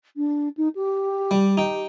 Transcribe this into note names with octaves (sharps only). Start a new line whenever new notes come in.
D4
D#4
G4
G3
D#4 G5